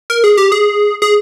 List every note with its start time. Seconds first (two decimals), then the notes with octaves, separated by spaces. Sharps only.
0.10 A#4
0.24 G#4
0.37 G4
0.52 G#4
1.02 G#4